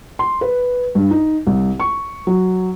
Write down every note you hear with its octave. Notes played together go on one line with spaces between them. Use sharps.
C6
B4
G2
D#4
C2
C#6
F#3